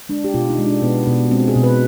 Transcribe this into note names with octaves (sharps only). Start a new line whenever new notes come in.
G#3 D4
G4
B2 F4
D#4
G#3
D4
B2 B3
B2
G#3 C4
G#4
B2
B4